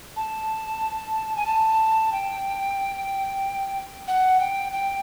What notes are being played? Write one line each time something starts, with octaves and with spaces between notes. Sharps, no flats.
A5
G#5
A5
G5
F#5
G5
G5